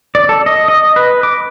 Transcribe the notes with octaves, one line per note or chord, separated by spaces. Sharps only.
D5
A4
D#5
D#5
B4
D6